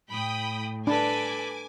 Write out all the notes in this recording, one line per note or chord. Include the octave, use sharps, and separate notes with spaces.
A2 G5 B5 D#6
D4 A4 B4 G#5 D6